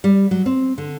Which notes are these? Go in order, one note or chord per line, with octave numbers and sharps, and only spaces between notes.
G3
F#3
C4
D3